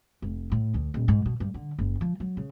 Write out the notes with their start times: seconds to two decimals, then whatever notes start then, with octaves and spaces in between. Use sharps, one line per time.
0.22 F1
0.52 A2
0.74 D2
0.94 D#1
1.08 G#2
1.26 B2
1.40 G2
1.54 D3
1.79 F#1
2.01 F3
2.20 F#3
2.37 C#3